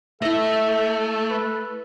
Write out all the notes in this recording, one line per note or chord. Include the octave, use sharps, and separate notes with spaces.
A3 E4 A4 D#5 E5
B4